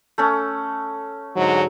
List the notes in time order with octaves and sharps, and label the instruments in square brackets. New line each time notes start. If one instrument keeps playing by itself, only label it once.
[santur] A3 C#4
[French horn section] G#2 D3 F#3